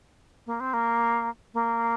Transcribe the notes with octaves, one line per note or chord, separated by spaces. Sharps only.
A#3
C4
A#3
A#3